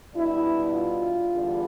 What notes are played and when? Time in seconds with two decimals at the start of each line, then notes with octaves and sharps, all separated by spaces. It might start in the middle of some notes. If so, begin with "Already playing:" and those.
0.14 B2 G3 D4 E4
0.72 F4
1.30 E2 D3 G3